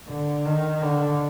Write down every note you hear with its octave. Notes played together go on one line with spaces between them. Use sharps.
D3
D#3
D3